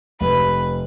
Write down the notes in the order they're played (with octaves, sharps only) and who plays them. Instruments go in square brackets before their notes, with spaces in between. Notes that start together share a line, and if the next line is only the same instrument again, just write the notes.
[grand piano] F1 [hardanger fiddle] B4